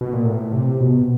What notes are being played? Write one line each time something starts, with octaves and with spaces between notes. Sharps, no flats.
B2
A#2
A2
C3
B2